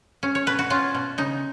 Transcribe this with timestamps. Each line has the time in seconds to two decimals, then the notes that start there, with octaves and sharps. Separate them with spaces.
0.23 C#4
0.35 C#5
0.46 B2 B4
0.59 F#4
0.70 C#4 F4
0.94 B2
1.18 C#3 D#4